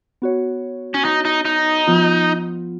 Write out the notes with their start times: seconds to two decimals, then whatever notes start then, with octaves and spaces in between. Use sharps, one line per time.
0.22 B3 F#4 C#5
0.94 C#4
1.05 D#4
1.25 D#4
1.45 D#4
1.87 F3 B3 F4